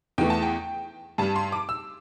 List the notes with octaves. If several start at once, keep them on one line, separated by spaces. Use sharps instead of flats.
E2 E3 A3 G5
A5
G5
G2 G3 A5
C6
D6
E6